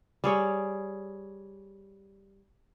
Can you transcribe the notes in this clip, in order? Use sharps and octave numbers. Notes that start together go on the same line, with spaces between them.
G3 G#4 C#5 G5